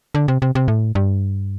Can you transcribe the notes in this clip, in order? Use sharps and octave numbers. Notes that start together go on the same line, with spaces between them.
D3
C3
C3
C3
A2
G2